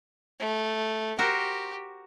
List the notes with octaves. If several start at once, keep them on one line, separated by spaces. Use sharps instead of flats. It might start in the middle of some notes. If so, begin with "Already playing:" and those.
A3
F#4 G4 A#4 C5